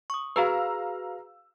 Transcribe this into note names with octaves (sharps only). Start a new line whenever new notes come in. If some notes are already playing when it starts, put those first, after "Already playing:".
C#6 D#6
F#4 G#4 B4 F5 A#5 E6